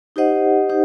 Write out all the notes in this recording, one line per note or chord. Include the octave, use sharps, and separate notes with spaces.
D#4 G4 C5 D#5 F#5
D#4 G4 C5